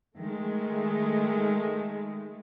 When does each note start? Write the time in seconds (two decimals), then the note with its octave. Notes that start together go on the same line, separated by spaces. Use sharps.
0.18 D#3 G#3 A3